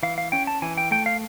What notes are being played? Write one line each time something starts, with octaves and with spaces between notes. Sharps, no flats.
E3 F5
F5
C#4 G5
A5
E3 G#5
G5
A3 G5
F5